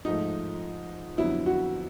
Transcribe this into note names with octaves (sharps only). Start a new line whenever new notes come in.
G#2 F3 A3 D#4
F2 D3 F#3 B3 E4
F#4